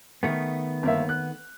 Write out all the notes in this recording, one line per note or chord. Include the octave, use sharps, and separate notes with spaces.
D#3 A3 B3
G1 A#3 E5
F#6